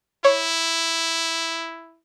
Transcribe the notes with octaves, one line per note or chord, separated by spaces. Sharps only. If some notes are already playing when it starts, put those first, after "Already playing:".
E4 C#5